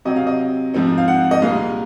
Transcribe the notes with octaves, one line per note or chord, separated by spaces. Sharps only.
C3 F#3 C4 D#5
F5
D#5
G#2 F3 C4 D#4
F5
F#5
D#5
C2 A#2 G#3 F5